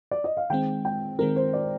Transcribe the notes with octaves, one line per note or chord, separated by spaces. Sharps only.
D5
D#5
F5
D#3 G#3 C4 G5
G5
D#3 G#3 C4 A#4
C5
D5